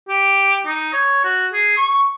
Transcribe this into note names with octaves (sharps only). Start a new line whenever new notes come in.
G4
D#4
C#5
F#4
G#4
C#6